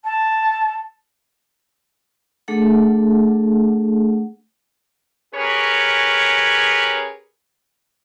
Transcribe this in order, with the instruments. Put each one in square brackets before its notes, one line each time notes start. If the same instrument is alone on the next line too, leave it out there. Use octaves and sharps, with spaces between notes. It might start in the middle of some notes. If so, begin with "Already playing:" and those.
[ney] A5
[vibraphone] A3 D4 G#4 A4 F#5
[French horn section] C#4 G4 G#4 A#4 B4 C#5